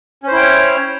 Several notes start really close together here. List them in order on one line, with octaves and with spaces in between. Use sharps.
C#4 C5 E4 G5 C#5